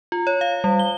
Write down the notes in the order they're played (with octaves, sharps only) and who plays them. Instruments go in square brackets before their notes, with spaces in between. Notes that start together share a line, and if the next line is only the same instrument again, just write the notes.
[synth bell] F4
C#5
F5
G3
G7